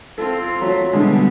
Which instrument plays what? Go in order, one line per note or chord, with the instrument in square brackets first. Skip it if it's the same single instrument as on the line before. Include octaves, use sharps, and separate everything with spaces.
[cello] C4 F4 [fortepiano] A4
[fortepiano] F#3 [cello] A3
[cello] B2 G3 [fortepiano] D3 G#3